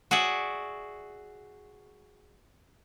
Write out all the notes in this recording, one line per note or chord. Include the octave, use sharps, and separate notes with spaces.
F#4 G#4 D5 E5 F#5